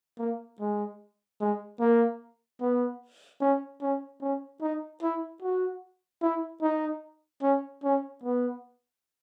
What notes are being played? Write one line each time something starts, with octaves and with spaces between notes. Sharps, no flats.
A#3
G#3
G#3
A#3
B3
C#4
C#4
C#4
D#4
E4
F#4
E4
D#4
C#4
C#4
B3